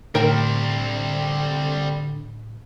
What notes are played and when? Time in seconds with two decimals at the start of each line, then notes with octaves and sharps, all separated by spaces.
0.15 A2 D3 G3 C4 A#4 G5